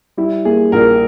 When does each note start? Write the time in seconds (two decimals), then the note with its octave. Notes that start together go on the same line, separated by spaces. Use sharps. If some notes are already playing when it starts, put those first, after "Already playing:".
0.17 G3 E4
0.45 A#3 G#4
0.72 A#1 A#4